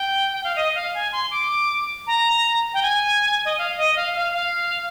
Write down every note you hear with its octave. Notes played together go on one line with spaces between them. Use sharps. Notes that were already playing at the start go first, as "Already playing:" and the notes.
Already playing: G5
G5
F5
D#5
F5
G#5
C6
D6
A#5
G5
G#5
D#5
F5
D#5
F5
F5
F5